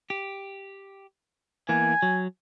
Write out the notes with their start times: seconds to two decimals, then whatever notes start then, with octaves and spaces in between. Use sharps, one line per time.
0.10 G4
1.69 E3 A#3 B3 G#5
2.02 F#3